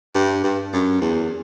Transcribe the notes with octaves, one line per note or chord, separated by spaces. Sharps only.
G2
G2
F#2
E2